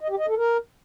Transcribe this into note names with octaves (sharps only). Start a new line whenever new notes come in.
D#5
G4
D#5
A4
A#4